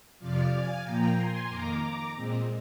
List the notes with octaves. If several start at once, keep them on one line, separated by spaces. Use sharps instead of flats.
F2 C3 F3 D5 F5
F5 G#5
A#2 F3 A#3 G5 A#5
G#5 C6
F2 D#3 A#3 A#5 D6
A#2 G#3 C4